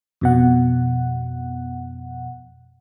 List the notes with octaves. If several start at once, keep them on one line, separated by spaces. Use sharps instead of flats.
F2 B2 F#5